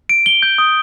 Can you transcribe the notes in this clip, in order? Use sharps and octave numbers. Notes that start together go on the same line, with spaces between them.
D7
G7
G6
D#6